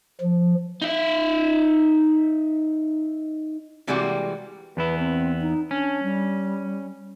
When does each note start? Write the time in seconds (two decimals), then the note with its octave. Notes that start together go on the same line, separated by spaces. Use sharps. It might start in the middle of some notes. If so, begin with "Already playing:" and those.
0.21 F3
0.82 D#4 E5
3.87 C3 E3 G3 G#3 A#3 F#4
4.77 E2 B3 E4 B4
4.99 C4
5.41 D#4
5.71 C#4 D4
6.03 G3